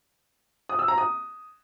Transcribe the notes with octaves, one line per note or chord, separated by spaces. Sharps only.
D#6
E6
A#5
D#6